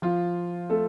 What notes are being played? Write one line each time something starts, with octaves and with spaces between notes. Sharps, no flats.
F3 F4
A3 A4